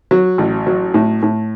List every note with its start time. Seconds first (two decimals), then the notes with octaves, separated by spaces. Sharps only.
0.11 F#3
0.38 A1
0.67 F#3
0.94 A2
1.23 A2